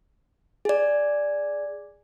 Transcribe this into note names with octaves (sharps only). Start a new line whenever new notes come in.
G#4 D5